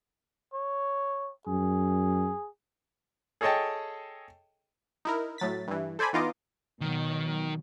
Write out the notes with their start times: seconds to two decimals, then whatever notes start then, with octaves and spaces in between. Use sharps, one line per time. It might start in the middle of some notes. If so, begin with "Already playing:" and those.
0.54 C#5
1.47 F#2 G#4
3.41 G#4 A4 C#5 D#5 G5 A5
5.05 D#4 E4 A#4
5.38 A2 F#3 A6 B6
5.68 G2 E3
5.99 A4 C5 D5 G#5 B5
6.13 E3 B3 D#4 F4 D#5 D6
6.81 B2 D#3 F#3